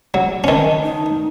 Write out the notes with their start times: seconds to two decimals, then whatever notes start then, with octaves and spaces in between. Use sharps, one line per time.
0.14 F#3
0.44 D#3 C#4 A5
0.83 D#4